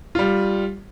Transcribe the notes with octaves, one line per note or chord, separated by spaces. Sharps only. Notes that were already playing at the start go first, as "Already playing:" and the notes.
G3 F4